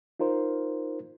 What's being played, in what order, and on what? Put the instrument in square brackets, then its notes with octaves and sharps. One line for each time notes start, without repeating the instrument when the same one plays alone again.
[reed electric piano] D#4 F4 A#4 C5